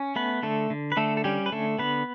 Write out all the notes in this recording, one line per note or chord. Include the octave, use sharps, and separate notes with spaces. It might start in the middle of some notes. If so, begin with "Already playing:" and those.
Already playing: C#4
A3 B3 B4
D3 A3 A4
D3
B4
D3 A3 A4
A4
G3 C#4 G4
B4
D3 A3 A4
D3 B3 B4